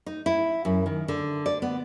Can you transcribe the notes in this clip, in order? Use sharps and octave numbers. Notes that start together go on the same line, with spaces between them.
D#4
E4
F#2
D#3
D3
D5
B3